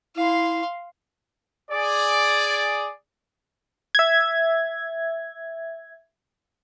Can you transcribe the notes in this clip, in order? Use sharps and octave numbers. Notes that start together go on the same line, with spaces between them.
E4 F5 C6
G#4 D5
E5 G#6